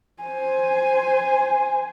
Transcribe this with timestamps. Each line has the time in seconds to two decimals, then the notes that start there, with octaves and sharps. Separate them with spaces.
0.22 C5 G#5